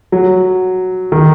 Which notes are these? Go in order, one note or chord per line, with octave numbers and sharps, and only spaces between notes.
F#3
D#3